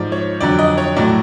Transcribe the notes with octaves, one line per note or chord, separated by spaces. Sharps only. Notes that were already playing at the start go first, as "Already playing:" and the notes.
Already playing: G#2 F3 D5
C#5
F2 D3 F#3 D5
D#5
C#5
A2 F#3 D5